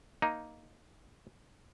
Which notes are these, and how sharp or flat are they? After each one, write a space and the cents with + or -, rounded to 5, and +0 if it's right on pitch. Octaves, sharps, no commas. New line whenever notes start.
A#3 +0 D#4 +0